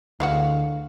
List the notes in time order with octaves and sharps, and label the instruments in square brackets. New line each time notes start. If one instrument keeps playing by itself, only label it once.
[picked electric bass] D2 [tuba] D3 [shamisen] E3 G#3 F#4 [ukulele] F5